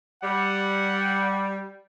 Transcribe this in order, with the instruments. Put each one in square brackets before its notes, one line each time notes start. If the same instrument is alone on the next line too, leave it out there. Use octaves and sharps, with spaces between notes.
[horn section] G3 [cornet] F#5